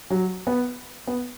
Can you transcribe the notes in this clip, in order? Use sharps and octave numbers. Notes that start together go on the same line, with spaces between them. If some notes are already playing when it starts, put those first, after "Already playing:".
F#3
B3
B3